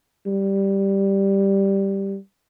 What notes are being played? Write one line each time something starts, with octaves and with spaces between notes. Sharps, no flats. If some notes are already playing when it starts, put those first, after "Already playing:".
G3